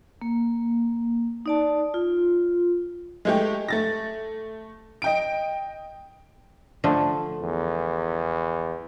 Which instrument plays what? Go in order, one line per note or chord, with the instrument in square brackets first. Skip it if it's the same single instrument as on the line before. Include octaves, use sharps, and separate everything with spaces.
[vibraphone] A#3
D#4 D5 A5
F4
[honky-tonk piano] G#3 A3 G4
A3 A6 A#6
D#5 G5 D7
[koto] D3 F3 A3
[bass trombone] E2